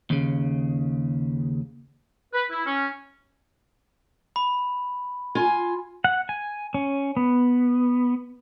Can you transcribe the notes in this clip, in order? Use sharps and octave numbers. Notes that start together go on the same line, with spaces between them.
D#2 C#3
B4
E4
C#4
B5
F4 G#5
F#5
G#5
C#4
B3